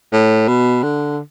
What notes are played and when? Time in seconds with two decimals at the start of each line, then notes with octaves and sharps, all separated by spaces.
0.12 A2
0.48 B2
0.83 D3